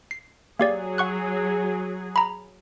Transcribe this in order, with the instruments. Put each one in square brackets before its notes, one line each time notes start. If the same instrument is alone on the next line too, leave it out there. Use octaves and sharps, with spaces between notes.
[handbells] C7
[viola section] F#3 G#4 [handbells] A#3 G4 D5
[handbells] F#5 C#6 F#6
A#5 B5